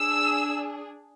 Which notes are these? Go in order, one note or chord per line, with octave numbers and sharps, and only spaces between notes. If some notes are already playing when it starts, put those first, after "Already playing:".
Already playing: D4 G#4 E6